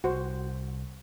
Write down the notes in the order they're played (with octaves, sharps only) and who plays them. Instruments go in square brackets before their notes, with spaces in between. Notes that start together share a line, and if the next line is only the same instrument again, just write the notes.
[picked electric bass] C2 [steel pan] F#4 C5